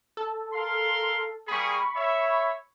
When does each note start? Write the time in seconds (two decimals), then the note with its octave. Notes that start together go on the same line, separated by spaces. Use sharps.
0.17 A4
0.53 A#4 F5 C6
1.48 G3 A#3 G#4 B5 C#6
1.96 C#5 E5